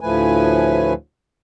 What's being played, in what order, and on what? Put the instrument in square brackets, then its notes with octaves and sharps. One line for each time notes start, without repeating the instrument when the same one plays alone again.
[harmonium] D2 A2 F3 A3 B4 G#5